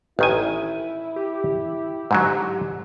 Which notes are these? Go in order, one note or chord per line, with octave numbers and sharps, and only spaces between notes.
A1 D#3 E4 G#5
G4
G#2 D3 F#3